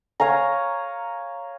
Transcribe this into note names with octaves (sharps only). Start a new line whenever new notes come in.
C#5 F5 G#5 A#5